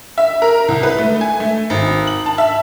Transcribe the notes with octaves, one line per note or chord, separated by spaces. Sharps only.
E5
A#4
C2
B4
A3
G#5
A3
G#1
F#7
A5
E5